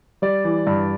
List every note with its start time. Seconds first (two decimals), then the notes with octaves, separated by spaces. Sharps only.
0.22 G3 D5
0.44 E3
0.67 G2